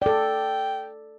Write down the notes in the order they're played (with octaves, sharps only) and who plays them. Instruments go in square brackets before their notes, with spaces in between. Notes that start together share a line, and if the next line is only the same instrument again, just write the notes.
[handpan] A4 D5 [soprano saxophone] G5